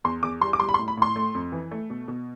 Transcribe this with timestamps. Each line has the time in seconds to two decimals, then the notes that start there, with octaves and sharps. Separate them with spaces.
0.04 E2 C6
0.23 E2 D6
0.41 G3 C6
0.53 D6
0.60 G3 C6
0.69 B5
0.74 C6
0.79 A2
0.88 B5
0.97 A2 C6
1.16 A3
1.35 F2
1.52 E3
1.71 A3
1.90 B2
2.08 B2